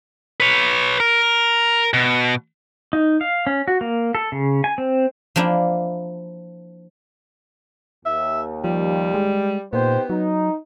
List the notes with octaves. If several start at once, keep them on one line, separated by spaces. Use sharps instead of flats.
B4 C#5
A#4
B2
D#4
F5
C#4
F#4
A#3
A4
C#3
G#5
C4
F3 A#3 D4 E4
D#2 E5
F3 G3
G#3
A#2 B3 D#4 G4 C5
F#3 D#4